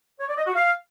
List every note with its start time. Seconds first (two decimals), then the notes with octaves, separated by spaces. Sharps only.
0.20 C#5
0.29 D5
0.38 D#5
0.47 F#4
0.55 F5